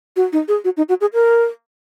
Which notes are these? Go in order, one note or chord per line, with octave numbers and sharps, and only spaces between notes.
F#4
D#4
G#4
F#4
D#4
F#4
G#4
A#4